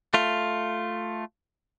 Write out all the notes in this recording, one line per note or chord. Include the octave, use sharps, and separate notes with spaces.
A3 F4